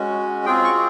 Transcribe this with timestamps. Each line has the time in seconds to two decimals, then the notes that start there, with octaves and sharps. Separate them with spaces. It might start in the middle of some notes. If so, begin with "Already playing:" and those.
Already playing: G#3 C#4 F#4
0.45 C4 F4 G#4 G5
0.64 C#6